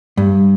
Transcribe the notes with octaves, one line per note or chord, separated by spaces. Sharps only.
G2